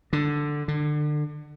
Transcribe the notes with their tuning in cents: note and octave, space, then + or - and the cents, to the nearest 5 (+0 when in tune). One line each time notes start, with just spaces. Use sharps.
D3 +5
D3 +30